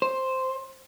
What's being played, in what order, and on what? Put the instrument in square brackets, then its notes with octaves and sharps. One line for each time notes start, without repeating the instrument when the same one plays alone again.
[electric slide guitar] C5